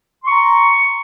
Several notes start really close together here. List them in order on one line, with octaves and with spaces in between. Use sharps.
C6 C#6 A#5